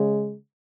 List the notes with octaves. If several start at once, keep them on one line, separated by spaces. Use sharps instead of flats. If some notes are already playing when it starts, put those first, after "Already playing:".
Already playing: C#3 G#3